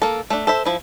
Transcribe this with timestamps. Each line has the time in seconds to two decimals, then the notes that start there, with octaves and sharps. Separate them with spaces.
0.02 A#3 A4
0.30 A3 D4
0.47 A4 C5 E5
0.65 F3 E4